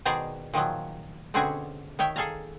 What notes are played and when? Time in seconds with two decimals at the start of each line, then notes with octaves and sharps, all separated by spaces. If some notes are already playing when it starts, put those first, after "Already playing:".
0.05 B2 D#3 G#4 C5 D5 A#5
0.54 A#2 D#3 F3 F#3
1.34 B2 D3 C4 C#4 F#4 G#4
1.99 D#3 C#5 E5 G5
2.16 G#4 A4 F5 G#5 A#5